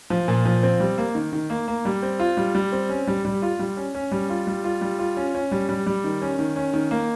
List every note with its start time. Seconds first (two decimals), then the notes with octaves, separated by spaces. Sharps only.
0.10 F3
0.28 A#2
0.45 F3
0.63 C4
0.80 G3
0.98 A#3
1.15 D#3
1.33 D#3
1.50 A#3
1.68 A#3
1.85 G3
2.02 C4
2.20 F4
2.37 G3
2.55 G3
2.72 C4
2.89 C#4
3.07 G3
3.25 G3
3.42 F4
3.59 G3
3.77 C#4
3.95 C#4
4.12 G3
4.30 F4
4.47 G3
4.64 F4
4.81 G3
4.99 F4
5.17 C#4
5.35 C#4
5.52 G3
5.69 G3
5.87 G3
6.04 D#3
6.21 C#4
6.39 D#3
6.56 C#4
6.74 D#3
6.91 A#3